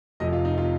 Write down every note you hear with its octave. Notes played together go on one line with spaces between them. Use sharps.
F1 F2 C3 D#5
F4
D#4
F4